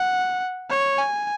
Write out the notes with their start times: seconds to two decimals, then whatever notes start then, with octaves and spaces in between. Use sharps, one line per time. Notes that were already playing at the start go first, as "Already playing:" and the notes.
Already playing: F#5
0.70 C#5
0.99 G#5